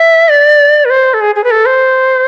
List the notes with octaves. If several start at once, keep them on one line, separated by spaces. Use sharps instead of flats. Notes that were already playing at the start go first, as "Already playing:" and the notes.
Already playing: E5
D5
B4
C5
A4
G#4
G#4
B4
A4
C5